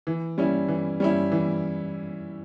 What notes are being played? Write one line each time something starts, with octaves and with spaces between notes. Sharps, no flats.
E3
G3 C#4 E4
E3
G3 C#4 E4
E3